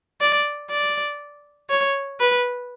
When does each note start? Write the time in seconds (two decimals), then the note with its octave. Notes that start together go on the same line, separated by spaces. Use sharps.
0.21 D5
0.71 D5
1.70 C#5
2.20 B4